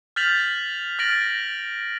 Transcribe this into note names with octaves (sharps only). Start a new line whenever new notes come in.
F6 G6 A6 B6 F7 F#7
F6 A6 A#6 D7 F#7